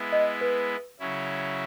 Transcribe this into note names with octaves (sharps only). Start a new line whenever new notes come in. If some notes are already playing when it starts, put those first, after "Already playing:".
Already playing: G#3 B3 E4
D#5
B4
C#3 F#3 C#4 E4